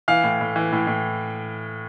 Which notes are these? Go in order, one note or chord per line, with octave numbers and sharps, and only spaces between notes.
E3 F5
A2
A2
E3
A2
A2